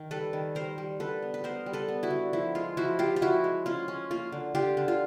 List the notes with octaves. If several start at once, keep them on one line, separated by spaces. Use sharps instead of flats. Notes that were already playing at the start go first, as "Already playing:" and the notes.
Already playing: D#3
G3 A4 B4
D#3
G3 A#4 C5
G3
D3 A4 B4
B3
B4
B3 A#4 C5
G3
A4 B4
B3
E4 F#4
D3
F3 E4
G#3 F4
F3 E4 F#4
F3 F4 G4
F4
F3 E4 F#4
G#3
C#4 F4
C#4
A#3 F4
D3
D3 F4 G4
D3
F4